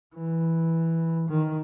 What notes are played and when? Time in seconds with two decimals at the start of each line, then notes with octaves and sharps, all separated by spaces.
0.16 E3
1.28 D#3